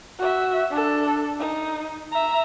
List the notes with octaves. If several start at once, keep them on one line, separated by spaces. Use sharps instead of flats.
F#4 E5
D4 A4
D#4
E5 A#5